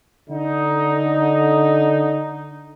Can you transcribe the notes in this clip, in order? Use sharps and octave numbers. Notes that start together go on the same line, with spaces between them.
D3 D#4